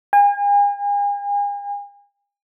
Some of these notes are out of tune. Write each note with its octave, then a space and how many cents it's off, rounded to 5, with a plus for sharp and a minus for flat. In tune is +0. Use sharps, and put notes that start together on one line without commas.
G#5 -40